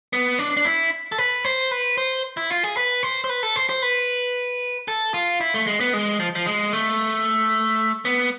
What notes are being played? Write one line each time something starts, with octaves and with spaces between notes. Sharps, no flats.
B3
D4
D4
E4
A4
B4
C5
B4
C5
E4
F4
G#4
B4
C5
C5
B4
A4
C5
C5
B4
A4
F4
E4
A3
G#3
B3
G#3
F3
F3
G#3
A3
B3